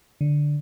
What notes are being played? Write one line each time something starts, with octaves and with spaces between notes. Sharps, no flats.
D3